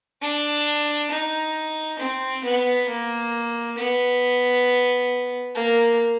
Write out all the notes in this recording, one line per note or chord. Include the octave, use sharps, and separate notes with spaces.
D4
D#4
C4
B3
A#3
B3
A#3